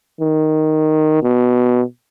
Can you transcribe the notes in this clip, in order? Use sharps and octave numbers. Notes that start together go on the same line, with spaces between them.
D#3
B2